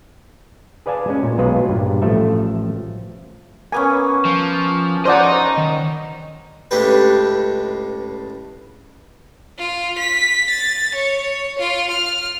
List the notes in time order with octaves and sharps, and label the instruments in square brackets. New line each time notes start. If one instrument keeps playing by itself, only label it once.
[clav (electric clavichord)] G#4 B4 D5 F5 G#5 A5
G#3 C#4
A#2
B1 B2 G#3 F4 B4
G2 A#2
A1 F3 A3 A4 E5
[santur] A#3 B3 C#4 [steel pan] G#5
[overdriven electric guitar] F3
[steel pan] C5 D5 F#5 [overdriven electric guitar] D#5 A#5
[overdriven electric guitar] D#3
[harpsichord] C#2 A2 A3 D4 G4 B4
[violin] F4
B6
A6
C#5
F4
F6